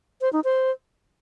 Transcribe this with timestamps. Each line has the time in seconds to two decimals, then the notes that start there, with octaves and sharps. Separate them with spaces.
0.21 C5
0.33 D#4
0.44 C5